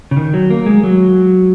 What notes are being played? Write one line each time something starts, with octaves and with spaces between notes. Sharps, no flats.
C#3
D#3
F#3
A#3
G#3
F#3